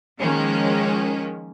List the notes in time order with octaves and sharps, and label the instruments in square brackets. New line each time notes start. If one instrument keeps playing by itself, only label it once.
[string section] D#3 F3 G#3 A#3 C#4